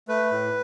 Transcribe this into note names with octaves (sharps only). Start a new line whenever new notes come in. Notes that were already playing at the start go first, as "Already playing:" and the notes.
A3 B4
A2